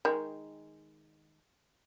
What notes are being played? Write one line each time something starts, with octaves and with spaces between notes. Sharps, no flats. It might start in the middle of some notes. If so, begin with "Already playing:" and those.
D#3 G#3